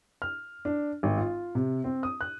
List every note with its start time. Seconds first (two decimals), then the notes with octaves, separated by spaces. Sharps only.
0.22 F6
0.65 D4
1.03 G#1
1.18 F4
1.55 C3
1.84 C4
2.03 D#6
2.21 F#6